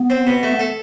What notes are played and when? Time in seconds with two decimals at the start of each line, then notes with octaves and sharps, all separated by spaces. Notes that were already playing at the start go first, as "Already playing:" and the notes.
Already playing: B3
0.10 C4
0.27 B2
0.43 A3
0.59 A4